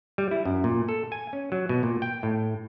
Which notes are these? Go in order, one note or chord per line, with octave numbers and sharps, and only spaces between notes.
G3
E4
F#2
A#2
A4
G#5
C#4
F#3
B2
A#2
G5
A2